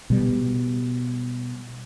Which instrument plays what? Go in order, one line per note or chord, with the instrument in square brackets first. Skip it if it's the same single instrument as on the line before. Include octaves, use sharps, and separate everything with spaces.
[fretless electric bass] B2 G3